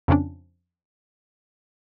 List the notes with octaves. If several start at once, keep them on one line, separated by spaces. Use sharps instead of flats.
F2 C#3 F3 C#4 D4